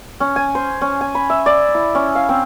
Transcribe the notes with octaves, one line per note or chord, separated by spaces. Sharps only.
C#4
G#5
C5
C#4
G#5
B5
E5
D5
E4
C#4
F5
C4